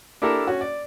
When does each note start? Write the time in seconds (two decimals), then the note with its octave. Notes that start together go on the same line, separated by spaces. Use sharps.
0.22 D4 E4 G4 A4 A#4
0.47 C#4 F#4
0.61 D5